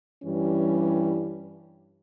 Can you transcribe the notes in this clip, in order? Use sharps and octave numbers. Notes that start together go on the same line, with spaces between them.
G2 E3 G3 C#4